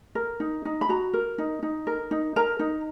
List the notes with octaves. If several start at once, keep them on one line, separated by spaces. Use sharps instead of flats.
A#4
D#4
D#4
B5
F#4 A#5
A#4
D#4
D#4
A#4
D#4
A#4 A#5
D#4